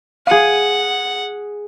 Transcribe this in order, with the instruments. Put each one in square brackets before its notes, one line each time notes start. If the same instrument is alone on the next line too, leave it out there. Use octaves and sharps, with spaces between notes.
[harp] G#4 D#7 [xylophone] F5 [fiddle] F#5